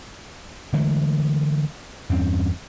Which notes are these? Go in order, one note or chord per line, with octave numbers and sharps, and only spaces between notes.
D3 E3 G#3 A3
E2 G2 C4 C#4